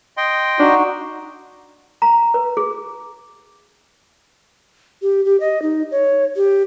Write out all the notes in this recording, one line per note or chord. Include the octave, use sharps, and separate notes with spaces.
D#5 G5 C6
D4 D#4 F#4
A#5
B4
G#4
G4
G4
D#5
D#4
C#5
G4